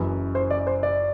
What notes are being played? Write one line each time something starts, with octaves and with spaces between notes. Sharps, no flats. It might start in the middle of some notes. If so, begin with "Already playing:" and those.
Already playing: F#1 F#2 E3
C5
D5
C5
D5